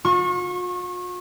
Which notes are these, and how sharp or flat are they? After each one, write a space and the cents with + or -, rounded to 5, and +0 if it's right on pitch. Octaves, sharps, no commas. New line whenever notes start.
F4 +45 C#6 -30